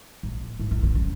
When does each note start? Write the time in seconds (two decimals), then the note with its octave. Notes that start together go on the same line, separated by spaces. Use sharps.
0.23 A#2
0.59 A2
0.71 A#2
0.83 C#3
0.95 C#3